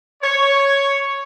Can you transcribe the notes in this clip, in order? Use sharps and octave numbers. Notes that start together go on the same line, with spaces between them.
C#5